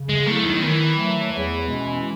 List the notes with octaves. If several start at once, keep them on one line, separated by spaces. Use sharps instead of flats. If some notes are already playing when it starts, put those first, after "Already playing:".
Already playing: C#3
G#3
F#3 A3 B3 E4
D#3
D#3 E3
F#3 A3
E2
B2 G#3 C#4